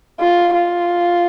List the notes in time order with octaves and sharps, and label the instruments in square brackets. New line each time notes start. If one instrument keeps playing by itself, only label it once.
[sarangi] F4
F4